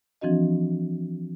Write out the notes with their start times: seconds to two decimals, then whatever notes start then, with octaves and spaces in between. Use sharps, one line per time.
0.21 E3 F3 C4 D4 F#4 D#5